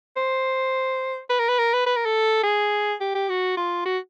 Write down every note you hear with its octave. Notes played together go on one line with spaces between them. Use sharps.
C5
B4
A#4
B4
A#4
B4
B4
A#4
A4
G#4
G4
G4
F#4
F4
F#4